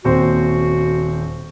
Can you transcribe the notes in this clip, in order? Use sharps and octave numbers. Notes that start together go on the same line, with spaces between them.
D#1 C4 F#4 C5